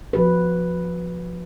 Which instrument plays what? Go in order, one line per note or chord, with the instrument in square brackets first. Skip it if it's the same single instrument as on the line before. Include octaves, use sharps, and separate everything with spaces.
[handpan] F3 F#4 B4